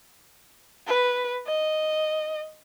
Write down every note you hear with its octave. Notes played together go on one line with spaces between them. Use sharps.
B4
D#5